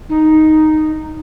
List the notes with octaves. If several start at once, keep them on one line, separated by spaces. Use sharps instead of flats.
D#4